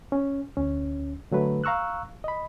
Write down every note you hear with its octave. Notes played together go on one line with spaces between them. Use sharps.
C#4
D2 C#4
D3 F#3 A3 B4
F5 A#5 C#6 E6 F#6
D#5 B5